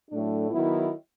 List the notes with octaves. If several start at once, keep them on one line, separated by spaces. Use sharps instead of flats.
A2 F#3 A3 D4
D#3 F#3 B3 E4